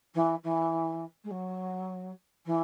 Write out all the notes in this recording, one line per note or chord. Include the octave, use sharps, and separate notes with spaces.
E3
E3
G#3
F#3
E3